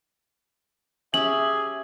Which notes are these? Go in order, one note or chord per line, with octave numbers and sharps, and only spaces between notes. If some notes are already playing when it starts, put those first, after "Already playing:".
C#4 G4 G#4 E5 F#7